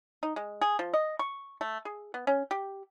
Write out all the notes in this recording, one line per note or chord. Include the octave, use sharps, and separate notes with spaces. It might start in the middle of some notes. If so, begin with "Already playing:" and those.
D#4
G#3
G#4
F3
D#5
C#6
A3
G#4
B3
C#4
G4